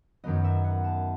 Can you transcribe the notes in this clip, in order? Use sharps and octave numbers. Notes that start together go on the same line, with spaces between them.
F#2 D#3 F#3 B3 D#5
E5
F#5
A5